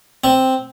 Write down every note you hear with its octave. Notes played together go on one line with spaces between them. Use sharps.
C4